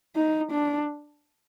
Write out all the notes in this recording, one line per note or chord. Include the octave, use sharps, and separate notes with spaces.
D#4
D4